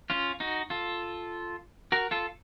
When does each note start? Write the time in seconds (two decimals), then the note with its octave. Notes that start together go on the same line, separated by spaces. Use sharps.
0.10 C#4 F4
0.40 D#4 F#4
0.70 F4 A4
1.92 F#4 A#4
2.11 F4 A4